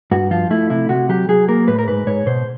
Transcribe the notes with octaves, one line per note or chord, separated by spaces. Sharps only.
G2 F#4
F3 F4
A3 E4
C3 E4
C3 F#4
F#3 G4
F#3 G#4
A#3 A#4
A2 B4
A#4
G#2 B4
G#2 C#5
B2 C5